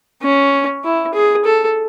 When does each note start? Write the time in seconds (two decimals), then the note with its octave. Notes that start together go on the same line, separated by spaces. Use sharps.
0.23 C#4
0.84 E4
1.14 G#4
1.45 A4